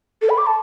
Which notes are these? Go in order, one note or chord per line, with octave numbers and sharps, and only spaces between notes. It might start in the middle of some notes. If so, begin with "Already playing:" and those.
A4
B5
D6
A5